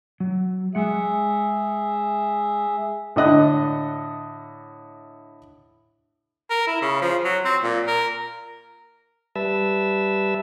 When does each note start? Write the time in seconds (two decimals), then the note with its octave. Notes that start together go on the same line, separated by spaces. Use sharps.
0.20 F#3
0.75 G#3 G#4 E5 F#5
3.16 A2 D3 D#5 F#6
6.50 A#4
6.67 E4
6.82 C#3
7.02 F3
7.25 F#3
7.45 C4
7.63 A#2
7.87 A#4
9.36 G3 B4 E5 A5 E6